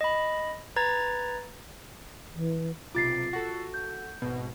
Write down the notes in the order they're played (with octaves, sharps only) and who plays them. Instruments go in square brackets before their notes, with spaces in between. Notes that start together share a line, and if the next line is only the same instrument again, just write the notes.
[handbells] D#5 B5
B4 A#5 G#6 A6
[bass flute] E3
[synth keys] B1 C3 D6 [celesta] F4 A6 C7
[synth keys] F#4 A4
[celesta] G6
[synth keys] G#1 B2